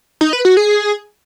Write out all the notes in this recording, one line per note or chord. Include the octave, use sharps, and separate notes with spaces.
D#4
B4
F#4
G#4